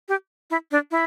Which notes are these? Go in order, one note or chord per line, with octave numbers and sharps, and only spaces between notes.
G4
E4
D4
E4